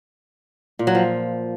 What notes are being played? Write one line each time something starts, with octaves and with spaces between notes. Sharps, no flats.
A#2
F#3
F3